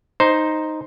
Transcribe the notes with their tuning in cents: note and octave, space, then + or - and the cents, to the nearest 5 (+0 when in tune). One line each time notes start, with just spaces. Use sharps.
D#4 +0 C5 +0